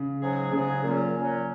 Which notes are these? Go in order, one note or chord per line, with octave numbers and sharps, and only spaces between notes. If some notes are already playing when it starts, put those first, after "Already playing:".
Already playing: C#3
G#2 F#3 C#4 G#4
G#2 C#3 F#3 C#4 G#4
A#2 F#3 A#3 C#4
A#2 F#3 C#4